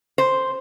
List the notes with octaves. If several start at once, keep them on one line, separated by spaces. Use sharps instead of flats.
C5